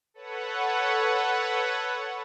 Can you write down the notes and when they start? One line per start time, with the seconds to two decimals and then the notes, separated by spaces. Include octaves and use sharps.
0.14 A4 B4 C#5 F#5